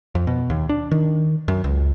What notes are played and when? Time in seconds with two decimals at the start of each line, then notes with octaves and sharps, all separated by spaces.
0.15 F2
0.27 B2
0.50 D#2
0.69 D4
0.91 D#3
1.48 F#2
1.64 C#2